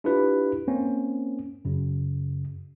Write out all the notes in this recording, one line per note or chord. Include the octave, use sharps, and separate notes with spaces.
D4 E4 F4 G4 B4
A#3 C4 C#4
F#2 C#3